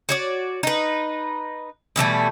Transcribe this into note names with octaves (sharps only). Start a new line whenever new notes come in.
F#4 C#5 D5
D#4 B4
B2 E3 G3 A3